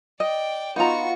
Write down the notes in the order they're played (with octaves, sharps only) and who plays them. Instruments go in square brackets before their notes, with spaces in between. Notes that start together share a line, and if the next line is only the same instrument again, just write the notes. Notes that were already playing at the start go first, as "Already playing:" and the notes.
[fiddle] D5 G5 [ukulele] D#5
[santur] B3 F4 D#5 [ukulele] D#4 A#5 [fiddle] F#4 C#6